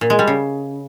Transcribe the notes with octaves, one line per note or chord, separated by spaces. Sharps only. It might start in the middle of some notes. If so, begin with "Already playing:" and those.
A#2
G#3
G3
C#3